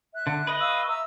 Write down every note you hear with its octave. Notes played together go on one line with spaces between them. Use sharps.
E5 F#6
D3
B4 D#5
F5 C#6 E6
E5 A#5 E6